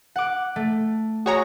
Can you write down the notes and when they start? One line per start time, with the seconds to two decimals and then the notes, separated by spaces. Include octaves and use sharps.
0.16 F#5 D6
0.56 A3
1.26 F#4 G#4 C#5 A#5